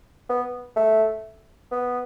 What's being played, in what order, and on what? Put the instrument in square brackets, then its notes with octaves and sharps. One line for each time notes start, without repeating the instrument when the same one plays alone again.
[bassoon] B3
A3
B3